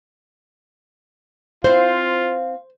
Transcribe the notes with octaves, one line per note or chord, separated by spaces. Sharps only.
C4 E4 F4 C5 F5